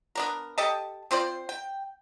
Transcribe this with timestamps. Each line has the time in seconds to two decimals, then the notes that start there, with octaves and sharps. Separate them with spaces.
0.15 B3 D4 A#4
0.58 G4 A4 D#5 A5
1.11 C4 F4 C5 D5
1.49 G5